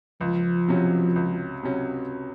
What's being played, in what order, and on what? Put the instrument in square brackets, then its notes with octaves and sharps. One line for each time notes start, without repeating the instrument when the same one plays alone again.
[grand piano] C#2 [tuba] F3
[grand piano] C3 F#3 C#4
C#2
C3 F#3 C#4